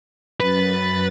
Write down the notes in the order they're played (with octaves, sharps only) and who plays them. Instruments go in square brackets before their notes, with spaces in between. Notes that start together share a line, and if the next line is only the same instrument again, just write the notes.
[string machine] F#2 A6 [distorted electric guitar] B4